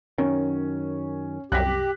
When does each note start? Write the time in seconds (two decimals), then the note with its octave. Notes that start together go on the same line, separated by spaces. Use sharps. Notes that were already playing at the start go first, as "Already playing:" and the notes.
0.18 F#2 D#3 C#4
1.52 C2 F#2 G4 F#6 A#6 B6